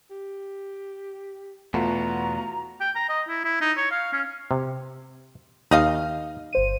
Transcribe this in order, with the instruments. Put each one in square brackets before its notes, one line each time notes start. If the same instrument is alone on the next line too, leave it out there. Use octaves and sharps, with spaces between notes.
[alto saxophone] G4
[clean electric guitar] E2 B2 [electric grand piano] A3 F4 F#4 [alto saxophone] B3 [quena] A#5
[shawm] G5
A#5
D#5
E4
E4
D#4
C#5
F5
C#4
[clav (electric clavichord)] C3
[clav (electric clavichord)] D#2 [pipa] D#4 D#5 F5
[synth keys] G1 C5 D#7